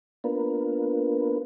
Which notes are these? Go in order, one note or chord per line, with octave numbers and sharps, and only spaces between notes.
A#3 B3 D4 F4 A#4 B4